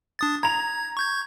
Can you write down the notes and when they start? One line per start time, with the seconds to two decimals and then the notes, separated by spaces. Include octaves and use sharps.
0.19 D4 D#6 A6
0.43 A#5 G#6 F7
0.97 C#6 G6 G#6